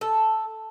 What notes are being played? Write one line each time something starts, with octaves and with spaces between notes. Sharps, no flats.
A4